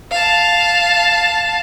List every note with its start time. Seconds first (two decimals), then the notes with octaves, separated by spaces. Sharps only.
0.11 F5 A5